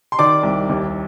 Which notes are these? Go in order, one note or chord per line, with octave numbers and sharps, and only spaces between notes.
C6
D#3 D5 D6
C2
D#2